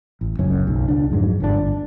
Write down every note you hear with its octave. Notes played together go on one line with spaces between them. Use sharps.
A1
F#1 C#2 F#2 C#4
B1
C#2 C#3 D4
F2 G#2 F#3
G1 G2 B2 D4